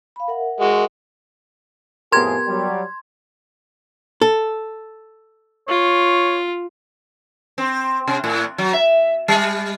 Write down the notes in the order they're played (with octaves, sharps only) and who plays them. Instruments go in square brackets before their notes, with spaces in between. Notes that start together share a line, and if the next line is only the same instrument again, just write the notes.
[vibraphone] F5 B5
A#4 E5 F#5
[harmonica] G#3 F#4
[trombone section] F2 A2 G#4 [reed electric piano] B3 G4 A#4 [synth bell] C6 G#6
[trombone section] F#3 G3
[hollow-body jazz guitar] A4
[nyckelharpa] F4 [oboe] C#5
[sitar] C4
C3
A2
F#3
E5
G3